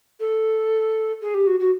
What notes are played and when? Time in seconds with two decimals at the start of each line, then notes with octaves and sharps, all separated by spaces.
0.20 A4
1.22 G#4
1.34 G4
1.47 F#4
1.60 F#4